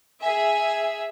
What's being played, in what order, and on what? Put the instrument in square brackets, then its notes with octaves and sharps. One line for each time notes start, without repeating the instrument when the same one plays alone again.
[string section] G#4 E5 [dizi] G#5